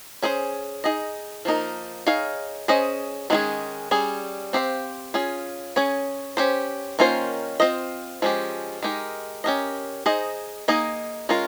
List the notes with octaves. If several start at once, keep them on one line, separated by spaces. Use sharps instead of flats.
C#4 G#4 C5
D#4 G#4 D#5
F3 A#3 D#4 A#4
D#4 G#4 C#5 F5
C#4 G#4 C5 D#5
D#3 G#3 C#4 F4 G#4
G3 C#4 G#4
C4 G4 C5 F5
C#4 F4 G#4
C#4 G#4 C#5
C#4 G4 C5
D#3 A#3 C#4 F4 C5
C4 F4 C5 D#5
F3 G#3 C#4 G4
G#3 D#4 G4 A#4
C#4 G4 A#4 D#5
D#4 G#4 C5 D#5
A#3 D#4 G#4 D#5
G#3 C#4 F4 A#4